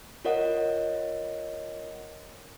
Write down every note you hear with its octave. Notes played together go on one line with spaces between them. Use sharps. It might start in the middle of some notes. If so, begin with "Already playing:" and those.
F4 A#4 C#5 D#5 F#5